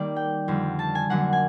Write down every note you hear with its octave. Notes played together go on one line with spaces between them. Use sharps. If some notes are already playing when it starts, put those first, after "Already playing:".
Already playing: D#3 G3 A#3 D5
G5
F2 D3 G3
A5
G#5
F2 D3 F#3 A#3 F#5
G#5